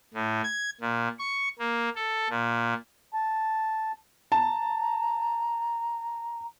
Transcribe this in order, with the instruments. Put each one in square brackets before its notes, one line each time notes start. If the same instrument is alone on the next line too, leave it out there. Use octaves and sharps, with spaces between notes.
[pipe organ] A2
G#6
A#2
C#6
A#3
A4
A#2
[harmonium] A5
[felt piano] A5 [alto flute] A#5